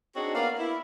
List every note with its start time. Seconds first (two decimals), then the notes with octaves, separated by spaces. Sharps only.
0.16 C4 D4 D#4 F#4 G#4 C#5
0.35 A#3 B3 A#4 D5 F5
0.58 E4